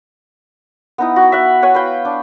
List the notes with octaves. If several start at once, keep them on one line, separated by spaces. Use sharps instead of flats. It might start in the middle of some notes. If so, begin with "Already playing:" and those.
B3 D#4 E4
F#4
E5 F#5
C#5 F#5 G#5
B4 F5 G5
D4